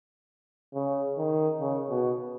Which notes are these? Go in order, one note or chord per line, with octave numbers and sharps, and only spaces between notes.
C#3
D#3
C#3
B2